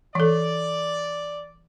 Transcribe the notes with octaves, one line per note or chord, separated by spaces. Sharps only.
E3 A4 D5